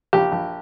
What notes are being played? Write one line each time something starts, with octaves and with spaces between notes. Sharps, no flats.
A#1 G4
A#1